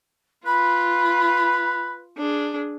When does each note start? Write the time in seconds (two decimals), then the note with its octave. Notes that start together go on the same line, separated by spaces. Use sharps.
0.46 F4 B4 B5
2.18 D4 G#4